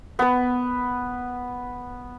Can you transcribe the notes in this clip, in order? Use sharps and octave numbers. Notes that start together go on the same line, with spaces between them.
B3 B4